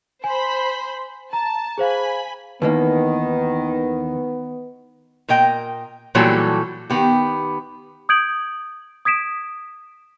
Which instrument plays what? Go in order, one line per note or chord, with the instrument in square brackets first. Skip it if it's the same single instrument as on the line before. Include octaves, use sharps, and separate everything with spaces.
[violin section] C5 B5 [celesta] G#5
[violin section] A5 [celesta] A#5
[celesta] G#4 C5 F5 [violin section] G#5 B5
[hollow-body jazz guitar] D#2 E3 A#3 [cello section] D#3 [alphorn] B3 [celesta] B4 D#5
[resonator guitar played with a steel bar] A#2 A#4 D#5 G5
A#2 E3 F#3 G3 F#4 A4
D#3 B3 G4
[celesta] D#6 G6 G#6 D7 F#7
D#6 G#6 B6 D7 E7